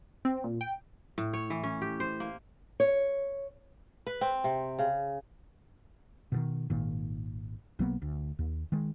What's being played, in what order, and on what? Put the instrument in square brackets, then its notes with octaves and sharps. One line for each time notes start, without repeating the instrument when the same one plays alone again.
[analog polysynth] C4
A#2
G5
[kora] A2
C#5
E3
C#4
G4
C5
A#3
[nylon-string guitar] C#5
[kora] B4
C4
C3
C#3
[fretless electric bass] B2 D3 D#3
G#1 A#2 D#3
B1 F#3 A#3 B3
D2
D#2
D#3 G#3